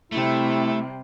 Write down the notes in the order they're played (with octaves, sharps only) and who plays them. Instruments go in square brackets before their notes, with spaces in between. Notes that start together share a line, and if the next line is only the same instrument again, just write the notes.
[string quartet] C3 G3 [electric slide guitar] A3 [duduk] E4